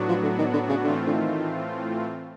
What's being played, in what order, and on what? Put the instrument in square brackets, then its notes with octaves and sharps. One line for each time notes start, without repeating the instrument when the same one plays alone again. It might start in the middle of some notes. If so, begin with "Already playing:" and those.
Already playing: [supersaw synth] A2 F#3 B3 D4 F#4
[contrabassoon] F3
D3
D#3
D3
C#3
[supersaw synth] A2 E3 A3 C4 F4 [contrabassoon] D3
[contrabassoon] D3
D#3